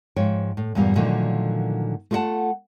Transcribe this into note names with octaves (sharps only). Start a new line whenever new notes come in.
G#2 F3 C#5 G5
A2
E2 G2 A#2 G3 A#3
A#2 D3 D#3 F3 F#3 A3
A3 F4 G#4 D#5 F#5 A5